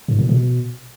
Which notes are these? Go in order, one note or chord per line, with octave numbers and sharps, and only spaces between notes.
G#2
A#2
B2